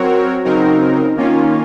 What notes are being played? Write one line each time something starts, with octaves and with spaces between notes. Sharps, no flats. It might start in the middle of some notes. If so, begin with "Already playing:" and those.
Already playing: F#3 C4 F#4 A#4 C#5
C#3 F#3 C4 D#4 A#4
D#3 A#3 C#4 F4